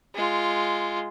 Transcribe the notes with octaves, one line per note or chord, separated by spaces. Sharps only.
G#3 F4